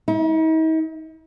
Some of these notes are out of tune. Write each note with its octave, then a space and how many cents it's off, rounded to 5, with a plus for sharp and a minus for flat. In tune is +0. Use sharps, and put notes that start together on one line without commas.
D#4 +45